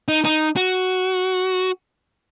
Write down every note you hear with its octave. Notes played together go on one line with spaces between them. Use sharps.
D#4
D#4
F#4